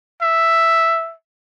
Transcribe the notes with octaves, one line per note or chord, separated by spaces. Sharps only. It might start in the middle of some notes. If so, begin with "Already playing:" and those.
E5